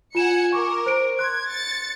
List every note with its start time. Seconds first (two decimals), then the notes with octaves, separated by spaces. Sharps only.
0.15 F4 F#5 G#5 C#7 E7
0.53 A#4 C#6 D6
0.86 C5 D7
1.19 C6 F#6 G#6
1.48 A6 C#7